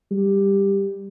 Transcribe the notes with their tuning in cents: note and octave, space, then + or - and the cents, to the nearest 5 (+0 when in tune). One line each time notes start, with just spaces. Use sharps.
G3 +10